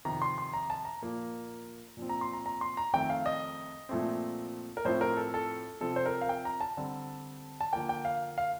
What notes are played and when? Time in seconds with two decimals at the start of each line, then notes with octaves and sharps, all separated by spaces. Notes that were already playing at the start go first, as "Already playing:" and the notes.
0.05 F2 C3 D#3 A#5
0.22 C6
0.38 C6
0.53 A#5
0.70 A5
0.85 A#5
1.02 A#2 F3 A#3
1.97 A#2 F3 C4
2.09 A#5
2.21 C6
2.33 A#5
2.46 A#5
2.61 C6
2.77 A#5
2.93 F2 D#3 A3 C4 G5
3.10 F5
3.26 D#5
3.89 A#2 F3 A3 C4
4.77 A#4
4.85 A2 F3 A3 C4 C5
5.01 A#4
5.17 A4
5.34 A4
5.81 C3 F3 C4 A4
5.96 C5
6.06 A#4
6.21 F5
6.29 G5
6.45 A#5
6.61 A5
6.77 D3 G3 C4
7.61 A5
7.73 D3 F3 A#3 G5
7.89 G5
8.05 F5
8.38 F5